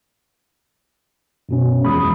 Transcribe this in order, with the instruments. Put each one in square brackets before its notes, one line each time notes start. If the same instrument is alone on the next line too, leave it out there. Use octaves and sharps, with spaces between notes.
[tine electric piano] F#2 B2 C#4
[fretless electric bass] E2 F3 G#3 [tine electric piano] B5 D#6